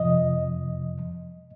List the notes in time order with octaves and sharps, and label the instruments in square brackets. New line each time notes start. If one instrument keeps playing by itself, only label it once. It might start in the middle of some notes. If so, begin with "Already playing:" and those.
Already playing: [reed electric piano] F2 C3 F3 D#5